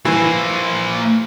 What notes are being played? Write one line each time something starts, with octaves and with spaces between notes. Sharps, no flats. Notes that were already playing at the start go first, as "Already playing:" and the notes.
E3 A#3 C5